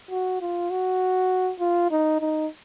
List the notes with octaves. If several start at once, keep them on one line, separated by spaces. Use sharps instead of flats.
F#4
F4
F#4
F4
D#4
D#4